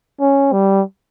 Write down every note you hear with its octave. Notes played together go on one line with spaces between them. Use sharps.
C#4
G3